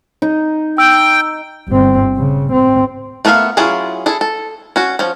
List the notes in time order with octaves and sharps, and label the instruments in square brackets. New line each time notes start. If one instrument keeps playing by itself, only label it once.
[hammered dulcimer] D#4
[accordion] G5 [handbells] E6
[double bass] G1 C4
C#3
C4
[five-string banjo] A3 B3 A#4 E5 F5
F#3 C#4 E4 F4 G#4
E4 G#4 A4
A4
C#4 F#4
F3 C#4